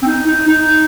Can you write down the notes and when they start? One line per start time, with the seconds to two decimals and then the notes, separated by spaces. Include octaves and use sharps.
0.02 C4
0.06 D#4
0.27 D#4
0.48 D#4